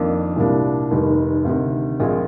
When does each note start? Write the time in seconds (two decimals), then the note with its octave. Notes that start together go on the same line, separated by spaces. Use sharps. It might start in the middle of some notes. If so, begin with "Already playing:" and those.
Already playing: F2 D#3 A#3 D4
0.36 C2 A#2 G3 A#3 D4
0.91 F1 D#2 D#3 G3
1.45 D2 C3 D#3
2.00 A#1 A#2 G#3